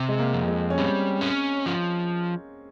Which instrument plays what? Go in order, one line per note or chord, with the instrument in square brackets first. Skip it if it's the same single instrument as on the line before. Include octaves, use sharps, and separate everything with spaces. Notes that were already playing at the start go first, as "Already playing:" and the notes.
Already playing: [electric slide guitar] C3
[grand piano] G#3
A#3
[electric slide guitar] F2
[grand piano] G#3
C#4
[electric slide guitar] G3 [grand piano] C4
[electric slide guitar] C#4
F3